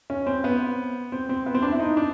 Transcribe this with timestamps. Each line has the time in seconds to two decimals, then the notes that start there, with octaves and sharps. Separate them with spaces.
0.10 C#4
0.26 C4
0.44 B3
1.12 C4
1.29 C4
1.46 B3
1.55 C4
1.62 D4
1.72 E4
1.79 D#4
1.97 D4